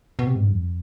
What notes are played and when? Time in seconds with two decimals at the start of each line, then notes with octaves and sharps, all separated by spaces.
0.19 B2
0.27 C3
0.36 G#2
0.44 G2
0.52 F2